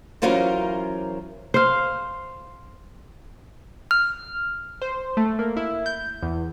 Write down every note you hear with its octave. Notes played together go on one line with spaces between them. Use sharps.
E3 F#3 C#4 F4 A#4 C5
C5 F5
F6
C5
A3
A#3
E4
G6
E2